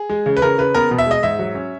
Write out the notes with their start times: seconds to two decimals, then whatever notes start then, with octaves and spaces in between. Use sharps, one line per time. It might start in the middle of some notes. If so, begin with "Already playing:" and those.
Already playing: G#4
0.09 G#3
0.26 C#3
0.37 B4
0.42 C#3 A#4
0.58 C#3 B4
0.74 B3 A#4
0.91 B2
0.98 E5
1.06 G#3 D#5
1.23 G#2 E5
1.39 F#3
1.55 C#4